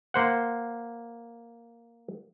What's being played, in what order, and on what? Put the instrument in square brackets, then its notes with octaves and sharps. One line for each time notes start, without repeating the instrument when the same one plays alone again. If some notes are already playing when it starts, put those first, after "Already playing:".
[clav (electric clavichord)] A#3 C5 F#5